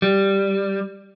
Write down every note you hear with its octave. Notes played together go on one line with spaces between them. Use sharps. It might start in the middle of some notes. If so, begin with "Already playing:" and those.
G3